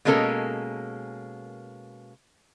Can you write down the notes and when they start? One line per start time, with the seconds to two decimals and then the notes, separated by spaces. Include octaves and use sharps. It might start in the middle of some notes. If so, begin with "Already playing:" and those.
0.05 B2 G#3 A#3 C#4 A4 A#4